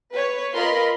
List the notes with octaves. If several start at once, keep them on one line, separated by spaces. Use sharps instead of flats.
B4 C#5
F4 A#4 D#5 B5 C6